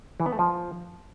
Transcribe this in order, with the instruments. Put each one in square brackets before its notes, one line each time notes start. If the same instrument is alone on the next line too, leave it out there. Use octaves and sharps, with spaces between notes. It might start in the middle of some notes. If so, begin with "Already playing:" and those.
[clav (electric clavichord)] E3
B3
A3
F3